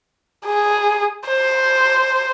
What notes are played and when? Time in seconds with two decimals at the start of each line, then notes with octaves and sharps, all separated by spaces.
0.45 G#4
1.28 C5